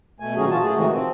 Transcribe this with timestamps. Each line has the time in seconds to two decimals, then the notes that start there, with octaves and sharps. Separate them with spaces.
0.20 B2 A3 G#5
0.36 A#2 D#3 F#3 C#4 F#4 G#4
0.50 A#2 E3 F4 F#4 A5
0.62 A3 G#4
0.74 A2 C3 D#3 E3 G#3 F#4
0.93 F3 C4